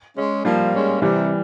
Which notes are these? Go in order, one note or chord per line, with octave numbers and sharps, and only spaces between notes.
G#3 C#4
F3 G3 A#3
G#3 C#4
C3 E3 G3